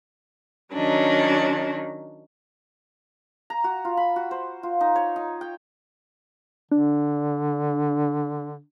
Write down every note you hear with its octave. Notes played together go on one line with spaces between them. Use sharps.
D#3 F#3 C#4 D4
A#5
F#4
F4
B5
F#4
C5
F4
D#4
C#5
D#4
G5
D3 D4